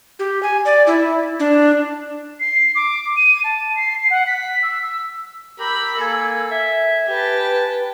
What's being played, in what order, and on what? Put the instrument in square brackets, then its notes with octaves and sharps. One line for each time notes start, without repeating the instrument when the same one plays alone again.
[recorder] G4
G#5
D5
E4
D4
[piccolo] C7
D6
D#7
A5
C7
F#5
B6
E6
E6
[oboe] G4 [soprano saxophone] A#4 [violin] B5 [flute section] E6
[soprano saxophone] A#3 [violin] A4 [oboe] G#5
[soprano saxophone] E5 [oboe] G#5
[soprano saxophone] G4 [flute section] B4 [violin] G5 A5